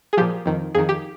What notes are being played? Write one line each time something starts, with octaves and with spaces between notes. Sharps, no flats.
G#4
A#2 F3 G4
F2 D#3
F2 D#3 G#4
G4